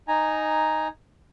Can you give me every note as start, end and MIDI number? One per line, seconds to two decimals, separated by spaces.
0.08 0.88 63
0.08 0.88 80
0.08 0.88 82